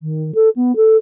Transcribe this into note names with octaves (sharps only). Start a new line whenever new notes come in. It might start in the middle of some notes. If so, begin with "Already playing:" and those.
D#3
A4
B3
A4